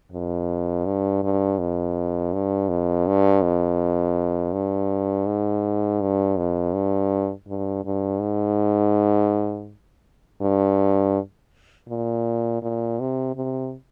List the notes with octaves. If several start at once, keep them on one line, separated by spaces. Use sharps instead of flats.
F2
G2
G2
F2
G2
F2
G2
F2
G2
G#2
G2
F2
G2
G2
G2
G#2
G2
A#2
A#2
C3
C3